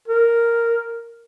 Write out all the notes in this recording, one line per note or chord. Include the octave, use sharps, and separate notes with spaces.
A#4